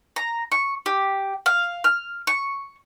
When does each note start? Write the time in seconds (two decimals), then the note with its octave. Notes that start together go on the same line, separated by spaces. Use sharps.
0.16 A#5
0.52 C#6
0.86 G4
1.46 F5
1.84 F6
2.27 C#6